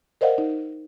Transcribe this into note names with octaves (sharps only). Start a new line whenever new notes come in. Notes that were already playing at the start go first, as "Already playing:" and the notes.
A#4 C5 D5 D#5 F5 F#5
D#4